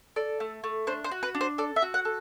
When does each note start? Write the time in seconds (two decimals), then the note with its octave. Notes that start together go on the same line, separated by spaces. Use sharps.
0.16 A4 D5
0.40 A3
0.64 A3
0.87 D4 C5
1.04 C5
1.11 F#4
1.23 B4
1.35 D4
1.41 C5
1.58 A4 D5
1.76 E5
1.82 F#4
1.94 F#5
2.05 A4